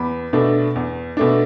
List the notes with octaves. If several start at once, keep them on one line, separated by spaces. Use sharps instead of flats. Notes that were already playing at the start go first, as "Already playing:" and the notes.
Already playing: E2 B5
B2 A3 D4
E2
B2 A3 D4